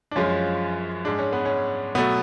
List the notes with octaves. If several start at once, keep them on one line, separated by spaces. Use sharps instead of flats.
D4
F#2 F3 G#3 C#4 F4
G#2 G#3 D4
C#4
B3
C#4
B2 F#3 A3 B3